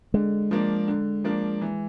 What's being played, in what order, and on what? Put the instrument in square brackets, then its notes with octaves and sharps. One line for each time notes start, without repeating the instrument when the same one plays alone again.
[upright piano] D3 [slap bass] G#3
[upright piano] F3 A#3 D4
D3
F3 A#3 D4
E3